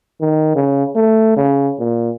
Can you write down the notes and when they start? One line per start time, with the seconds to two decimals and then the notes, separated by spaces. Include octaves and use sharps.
0.21 D#3
0.55 C#3
0.96 A3
1.37 C#3
1.79 A#2